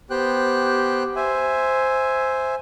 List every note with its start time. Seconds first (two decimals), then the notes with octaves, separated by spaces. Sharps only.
0.10 B3 G4 C5 G5 F#6
1.16 C5 E5 G#5